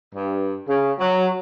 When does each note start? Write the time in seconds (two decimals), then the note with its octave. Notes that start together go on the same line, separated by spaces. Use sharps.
0.15 G2
0.68 C#3
0.99 F#3